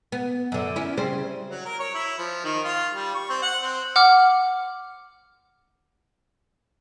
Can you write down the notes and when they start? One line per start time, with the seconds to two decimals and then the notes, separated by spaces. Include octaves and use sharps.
0.12 B3
0.52 F#2 D3
0.76 C#4 E4
0.97 C#3 G3 C4
1.50 F#3
1.65 A#4
1.80 C#5
1.95 E4
2.19 F3
2.44 D#3
2.65 F4
2.94 G3
3.15 C#6
3.30 C4
3.42 F#5
3.62 C4
3.96 F#5 D6 F6